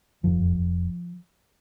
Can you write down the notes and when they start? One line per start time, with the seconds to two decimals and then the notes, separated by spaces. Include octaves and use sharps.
0.23 F1 F3
0.40 F1
0.56 F1